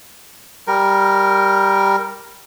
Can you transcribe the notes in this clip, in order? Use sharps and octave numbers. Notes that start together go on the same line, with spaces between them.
G3 A#4